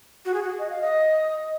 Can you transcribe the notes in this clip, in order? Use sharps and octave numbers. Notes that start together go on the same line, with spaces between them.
F#4
G#4
F#4
D#5
F5
D#5